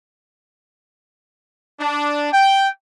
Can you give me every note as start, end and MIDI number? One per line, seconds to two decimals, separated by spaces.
1.80 2.29 62
2.32 2.69 79